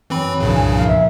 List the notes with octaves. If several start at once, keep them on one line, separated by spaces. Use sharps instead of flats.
F#2 E3 C4 B5
C2 G2 A#2 C#3 E3 F3
G#5
A#3 F5
E5